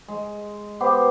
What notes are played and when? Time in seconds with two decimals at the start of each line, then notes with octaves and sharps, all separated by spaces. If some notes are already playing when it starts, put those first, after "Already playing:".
0.08 G#3
0.80 B3 G4 C5